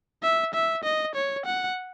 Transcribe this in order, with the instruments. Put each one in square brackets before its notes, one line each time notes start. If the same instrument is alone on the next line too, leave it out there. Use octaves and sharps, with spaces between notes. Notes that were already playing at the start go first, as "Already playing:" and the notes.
[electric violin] E5
E5
D#5
C#5
F#5